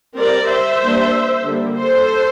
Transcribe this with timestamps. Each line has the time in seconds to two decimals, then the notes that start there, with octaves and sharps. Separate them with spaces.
0.16 G3 C4 A#4 D5
0.49 C5 E5
0.81 G3 A#3 D4
1.45 D3 G3 A#3
1.77 A4 C5